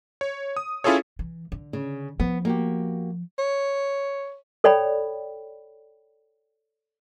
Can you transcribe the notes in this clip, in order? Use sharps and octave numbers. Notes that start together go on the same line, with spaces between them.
C#5
D#6
C#4 E4 F4 G#4 A4 C#5
E3
D3
C#3
F3 B3
A#3 F#4 G4
C#5
A4 C#5 D5 G5 B5